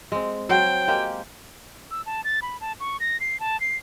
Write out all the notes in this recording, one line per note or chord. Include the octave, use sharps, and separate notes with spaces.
G#3 C4
F#3 C5 F5 G5
G#3 A#3 G4
E6
A5
A6
B5
A5
C#6
A#6
C7
A5
C7